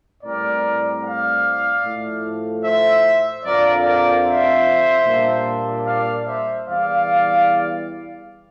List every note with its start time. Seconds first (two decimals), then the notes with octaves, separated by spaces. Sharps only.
0.23 A2 G3 C4 A#4 D5
1.04 D5 F5
1.84 A2 F3 A3
2.65 C5 E5
3.45 F2 D3 F3 A#4 D5
3.85 A#4 D5
4.25 C5 E5
5.06 A#2 G3 A#3 D4
5.87 D5 F5
6.27 C5 E5
6.67 E2 E3 G3 D5 F5